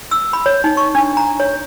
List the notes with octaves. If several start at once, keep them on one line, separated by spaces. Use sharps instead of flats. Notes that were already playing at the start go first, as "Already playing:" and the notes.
E6
B5
C#5
D#4
C#6
D4
A#5
C#5